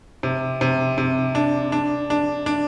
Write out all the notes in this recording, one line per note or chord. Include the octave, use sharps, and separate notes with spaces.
C3
C3
C3
D4
D4
D4
D4